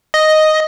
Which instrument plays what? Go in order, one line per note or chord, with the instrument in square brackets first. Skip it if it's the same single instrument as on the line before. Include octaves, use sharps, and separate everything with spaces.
[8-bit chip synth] D#5